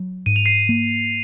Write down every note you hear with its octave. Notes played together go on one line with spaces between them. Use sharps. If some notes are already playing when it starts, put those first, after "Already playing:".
Already playing: F#3
G#2 D#7
F7
C7 D#7
A#3